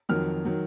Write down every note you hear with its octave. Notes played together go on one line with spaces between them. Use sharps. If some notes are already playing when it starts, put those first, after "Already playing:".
F2 D#3 F#3 F6
D#3 F#3